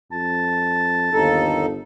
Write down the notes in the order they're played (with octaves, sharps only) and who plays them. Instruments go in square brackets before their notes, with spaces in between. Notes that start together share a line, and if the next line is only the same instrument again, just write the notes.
[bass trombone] F2 [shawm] A5
[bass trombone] G1 [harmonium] D#2 D#4 A4